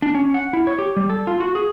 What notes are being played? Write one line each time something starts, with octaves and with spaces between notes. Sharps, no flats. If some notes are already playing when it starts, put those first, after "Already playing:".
D4
C#4
F#5
E4
C#5
G4
G3
A4
F4
F#4
G#4